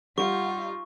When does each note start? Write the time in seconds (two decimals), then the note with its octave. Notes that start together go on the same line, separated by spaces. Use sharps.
0.18 G3 D#4 F4 F#5 C#6